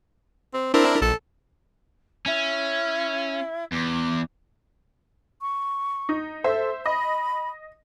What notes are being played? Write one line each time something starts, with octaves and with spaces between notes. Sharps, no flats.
C4
C4 D4 E4 A#4
A#1 A4
C#4 E4
E2 D6
C#6
D#4
A4 C5 E5
D#5 B5